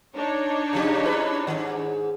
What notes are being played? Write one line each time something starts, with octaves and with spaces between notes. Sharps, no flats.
D4 D#4 C#5
C#3 F3 G4
E4 B4
G#2 D#3